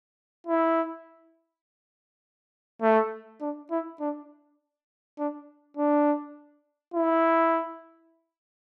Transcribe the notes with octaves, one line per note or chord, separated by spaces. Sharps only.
E4
A3
D4
E4
D4
D4
D4
E4